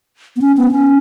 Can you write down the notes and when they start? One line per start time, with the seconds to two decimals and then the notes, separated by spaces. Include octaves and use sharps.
0.36 B3
0.41 C#4
0.57 B3
0.72 C#4